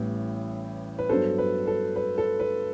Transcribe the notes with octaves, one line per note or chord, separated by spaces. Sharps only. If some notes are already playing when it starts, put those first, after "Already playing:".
Already playing: A1 A2 E3 G3 B3
B4
G2 F#3 B3 A4 C5
B4
A4
B4
A4
B4